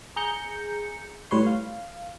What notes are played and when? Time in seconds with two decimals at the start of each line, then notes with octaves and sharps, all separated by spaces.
0.16 G#4 A#5 G6 C#7
1.31 A2 G3 B4 C#5 C6
1.47 F5